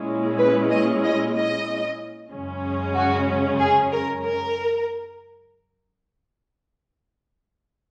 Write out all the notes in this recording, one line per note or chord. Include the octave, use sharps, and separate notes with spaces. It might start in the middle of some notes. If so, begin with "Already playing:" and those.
Already playing: A#2 G#3 C#4 E4
B4
D#5
D#5
D#5
F#2 C#3 G#3 C#4
F#4
G#4
A#4
A#4